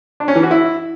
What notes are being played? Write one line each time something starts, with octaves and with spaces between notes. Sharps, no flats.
D4
C#4
E3
F#4
E4